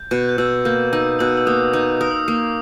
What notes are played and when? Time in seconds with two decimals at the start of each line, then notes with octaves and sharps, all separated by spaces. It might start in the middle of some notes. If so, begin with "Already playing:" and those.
Already playing: G6
0.11 B2
0.29 G6
0.38 B2 E6
0.65 A#3 G6
0.93 D#4 E6
1.19 B2 E6
1.37 E6
1.46 A#3 D#6
1.73 D#4
2.01 A#4 D#6
2.11 E6
2.20 D#6
2.28 A#3